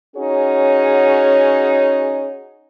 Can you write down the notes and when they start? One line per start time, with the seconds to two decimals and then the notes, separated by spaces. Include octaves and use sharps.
0.17 C#4 D#4 F#4 G#4 C#5